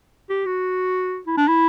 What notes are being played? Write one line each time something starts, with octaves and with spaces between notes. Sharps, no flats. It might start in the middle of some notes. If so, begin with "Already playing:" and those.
G4
F#4
E4
D4
E4